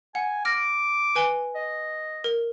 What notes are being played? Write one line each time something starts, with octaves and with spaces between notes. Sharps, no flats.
F#5 G#5
D6 F6 A#6
B4 G#5 G7
D#5
A#4